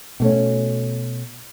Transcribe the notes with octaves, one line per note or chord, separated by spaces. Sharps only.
B2 A3 C#4